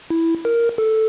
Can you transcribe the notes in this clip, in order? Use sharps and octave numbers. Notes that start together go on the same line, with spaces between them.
E4
A#4
A4